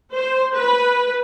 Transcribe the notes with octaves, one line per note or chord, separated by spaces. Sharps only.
C5
B4